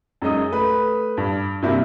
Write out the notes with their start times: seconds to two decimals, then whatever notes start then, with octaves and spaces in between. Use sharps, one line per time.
0.22 F#2 G#3 D#4 D#6
0.51 A3 B4
1.17 G2
1.62 G2 C3 A#3 E4 F#4